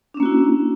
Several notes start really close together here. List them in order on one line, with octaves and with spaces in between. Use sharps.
D4 C#4 A#3 F#4 E4